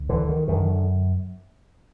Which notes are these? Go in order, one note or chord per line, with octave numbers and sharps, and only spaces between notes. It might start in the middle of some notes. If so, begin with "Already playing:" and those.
Already playing: D2
D3 E3
D#3
F#2 D3 D#3